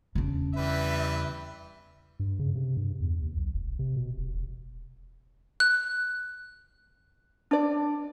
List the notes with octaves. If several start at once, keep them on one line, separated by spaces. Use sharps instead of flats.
E2 C#3 D4
E3 G3 B4 E5
G2
C#3
C3
G2
E2
D#2
B1
E1
C3
B2
E1
E1
F#6
D4 D5